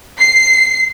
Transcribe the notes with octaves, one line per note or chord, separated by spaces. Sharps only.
C7